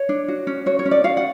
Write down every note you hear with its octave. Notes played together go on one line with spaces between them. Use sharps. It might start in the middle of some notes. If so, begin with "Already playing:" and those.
Already playing: C#5
D4
F#4
C#4
F#4 C#5
C#5
C#4
D5
F#4 F5
F#5